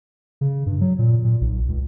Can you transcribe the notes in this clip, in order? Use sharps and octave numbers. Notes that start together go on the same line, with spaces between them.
C#3
G2
F#3
A#2
A#2
B1
C#2